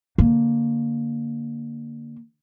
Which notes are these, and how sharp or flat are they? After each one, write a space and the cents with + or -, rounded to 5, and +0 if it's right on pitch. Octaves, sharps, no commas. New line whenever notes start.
D3 +0 A#3 +0